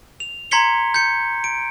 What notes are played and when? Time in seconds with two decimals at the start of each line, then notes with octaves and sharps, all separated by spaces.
0.20 F7
0.51 A#5 C6 G#6 B6 C#7 G7
0.94 G6 C#7
1.44 D7